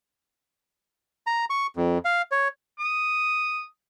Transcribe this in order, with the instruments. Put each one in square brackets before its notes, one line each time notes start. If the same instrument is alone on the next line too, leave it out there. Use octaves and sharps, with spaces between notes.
[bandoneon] A#5
C#6
F2
F5
C#5
[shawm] D#6